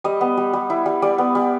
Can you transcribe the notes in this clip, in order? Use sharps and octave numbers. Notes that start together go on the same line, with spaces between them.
G3 D#5
B3
G3
G3
E4
G3
G3 D5
B3
G3